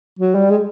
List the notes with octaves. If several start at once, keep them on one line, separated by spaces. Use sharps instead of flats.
F#3
G3
G#3